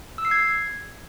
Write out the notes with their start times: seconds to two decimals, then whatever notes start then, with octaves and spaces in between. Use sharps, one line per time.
0.18 E6
0.25 C7
0.31 G#6